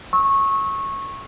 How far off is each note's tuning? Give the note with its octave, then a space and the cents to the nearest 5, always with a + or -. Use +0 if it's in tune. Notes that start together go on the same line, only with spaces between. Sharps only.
C#6 -20 E6 -30